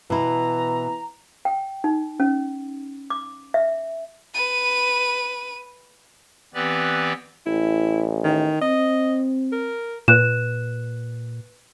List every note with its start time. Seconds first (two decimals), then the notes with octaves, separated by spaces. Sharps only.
0.10 B2 E3 E4 A#5
1.45 G5
1.84 D#4
2.20 C#4
3.10 D6
3.54 E5
4.34 B4 D#7
6.54 E3 B3 C4 G4 B4 D5
7.46 A1 E4
8.25 D#3
8.61 C4 D#5
9.52 A#4
10.08 A#2 B4 F#6 E7